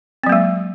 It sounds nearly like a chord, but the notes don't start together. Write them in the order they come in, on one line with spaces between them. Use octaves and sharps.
C4 F#3 A#3 G#3